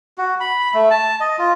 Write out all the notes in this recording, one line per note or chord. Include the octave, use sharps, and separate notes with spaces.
F#4
B5
A3
A5
D#5
F4